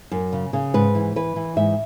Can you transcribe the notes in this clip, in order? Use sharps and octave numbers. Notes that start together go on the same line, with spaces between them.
F#2
C#3
C#3
G#2 B4
E3
E3 B4
E3
G#2 E5